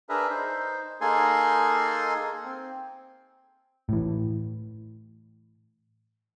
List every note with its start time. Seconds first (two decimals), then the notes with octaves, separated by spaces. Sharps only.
0.09 D4 G#4 A#4 B4 E5
0.30 D#4 C5
1.01 A#3 D#4 G#4 A4 G#5 C6
2.44 C4
3.89 A2 E3